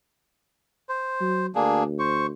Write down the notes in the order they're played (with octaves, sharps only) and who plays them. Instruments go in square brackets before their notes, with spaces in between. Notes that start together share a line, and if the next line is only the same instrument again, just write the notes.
[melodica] C5
[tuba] F#3
[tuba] D2 [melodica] A#3 D4 G#4
[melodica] C5 C#6